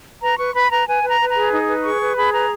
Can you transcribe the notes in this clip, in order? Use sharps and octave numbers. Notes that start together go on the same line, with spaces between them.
B4 A#5
B4 C#6
B4 B5
B4 A#5
B4 G#5
B4
A#5
B4
A#5
G#4
D#4
B4
G#4 C#6
B4
G#4 B5
B4 A#5